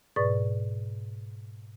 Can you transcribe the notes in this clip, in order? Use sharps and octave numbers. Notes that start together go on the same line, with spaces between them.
G#2 B2 B4 D5 C#6 A6